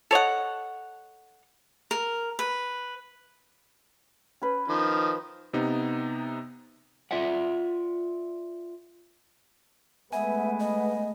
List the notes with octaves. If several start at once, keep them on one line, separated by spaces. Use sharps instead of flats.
A4 C#5 D#5 F#5
A#4
B4
C#4 B4
D#3 F3
C3 B3 D#4
F4 D5 E5 F#5
G#3 A3 B3 E5 G#5
D#5